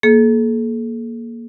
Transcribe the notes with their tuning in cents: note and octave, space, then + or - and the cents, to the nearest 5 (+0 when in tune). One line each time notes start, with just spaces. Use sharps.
A#3 +5 A4 -45